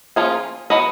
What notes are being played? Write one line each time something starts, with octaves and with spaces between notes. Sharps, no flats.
F3 A#3 C#4 F4 G#4
F#3 B3 F#4 B4 D#5